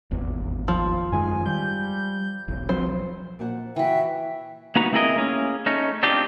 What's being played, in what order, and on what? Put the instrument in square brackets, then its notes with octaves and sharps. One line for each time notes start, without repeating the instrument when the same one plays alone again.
[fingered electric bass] D#1 G#1 E2
[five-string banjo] F3
[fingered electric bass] F#2 D#3 G#3 [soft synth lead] G#5
[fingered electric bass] G3 [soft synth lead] G6
[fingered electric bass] E1 B1
[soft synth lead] F3 [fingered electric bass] F#3 C4 [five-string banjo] C5
[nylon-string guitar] A#2 C5 F#5
[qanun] E3 F#4 [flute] E5 [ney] G5
[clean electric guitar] A#3 B3 D#4 F#4 B4 A#5
A3 C4 E4 G#4 A#4 D#5
A#3 C#4 G#4
A3 C#4 D#4
C4 D4 D#4 F4 G4